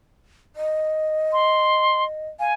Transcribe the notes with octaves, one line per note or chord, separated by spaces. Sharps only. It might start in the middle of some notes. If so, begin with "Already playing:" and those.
D#5
C6
F5 G#5